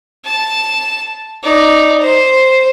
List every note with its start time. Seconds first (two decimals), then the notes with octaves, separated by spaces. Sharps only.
0.25 A5
1.43 D#4 D5
2.01 C5